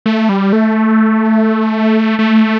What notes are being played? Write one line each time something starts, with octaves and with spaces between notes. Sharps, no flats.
A3
G3
A3
A3